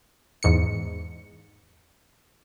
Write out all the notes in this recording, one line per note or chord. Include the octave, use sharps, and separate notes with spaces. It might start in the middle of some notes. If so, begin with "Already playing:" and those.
E2 G#2 C#7